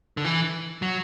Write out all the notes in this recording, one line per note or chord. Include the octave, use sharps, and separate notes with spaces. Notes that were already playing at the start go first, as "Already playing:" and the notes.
D3
E3
F#3